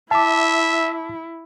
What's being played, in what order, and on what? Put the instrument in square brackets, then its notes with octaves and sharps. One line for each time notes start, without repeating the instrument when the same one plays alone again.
[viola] E4 [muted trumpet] E5 [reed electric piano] A5 D6